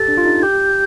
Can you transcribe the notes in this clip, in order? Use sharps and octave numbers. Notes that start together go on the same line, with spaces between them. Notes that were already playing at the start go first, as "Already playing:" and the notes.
Already playing: G4 A4 A6
D4
F4
D#4
G4 G6